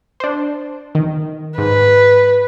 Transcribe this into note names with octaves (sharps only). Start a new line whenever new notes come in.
D4 C5
D#3
G#2 B4